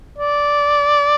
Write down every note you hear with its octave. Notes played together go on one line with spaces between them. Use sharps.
D5